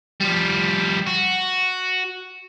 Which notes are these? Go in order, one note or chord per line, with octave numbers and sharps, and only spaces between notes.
F3 G3
F#4